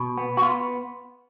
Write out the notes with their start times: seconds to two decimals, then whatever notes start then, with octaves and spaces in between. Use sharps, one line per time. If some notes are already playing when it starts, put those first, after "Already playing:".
Already playing: B2
0.18 B3
0.37 F#4
0.42 B3 F4